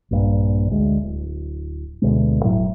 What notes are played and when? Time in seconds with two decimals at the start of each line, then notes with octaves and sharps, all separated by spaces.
0.11 A#1 G2 A#2
0.71 D2 G#3
1.03 D1
2.02 D2 B2 G#3
2.43 F1 A2 F#3